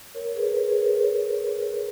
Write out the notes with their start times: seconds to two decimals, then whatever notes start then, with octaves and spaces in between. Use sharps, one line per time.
0.15 A#4 C#5
0.29 A#4
0.35 G#4 B4
0.57 G#4 B4
0.67 G#4 B4
0.78 A#4 C#5
0.88 G#4 B4
1.00 A#4 C#5